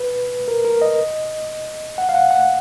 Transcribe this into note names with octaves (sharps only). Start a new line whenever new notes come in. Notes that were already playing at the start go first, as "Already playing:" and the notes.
Already playing: B4
A#4
A#4
D#5
F#5
F5
F#5
F#5